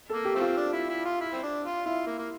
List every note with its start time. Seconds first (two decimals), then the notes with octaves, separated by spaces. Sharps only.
0.10 A4
0.14 A#3
0.25 G4
0.35 F3 A3 C4
0.41 F4
0.57 D4
0.73 E4
0.89 E4
1.05 F4
1.21 E4
1.32 C4
1.43 D4
1.64 F4
1.86 E4 F4
2.07 A#3
2.19 A#3